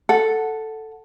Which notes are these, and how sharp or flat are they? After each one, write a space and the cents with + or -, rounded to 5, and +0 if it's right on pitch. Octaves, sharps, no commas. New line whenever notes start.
A4 +0 F#5 +0